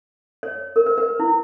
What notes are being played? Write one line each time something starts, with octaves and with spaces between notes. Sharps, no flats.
C#5
A#4
B4
B4
E4